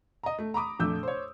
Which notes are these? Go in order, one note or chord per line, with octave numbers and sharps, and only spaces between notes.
D#5 A#5
A3
A#5 B5 D6 D#6
A#1 F2 A3 E6 G6
C5 C#5